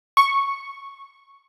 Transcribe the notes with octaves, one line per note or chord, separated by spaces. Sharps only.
C#6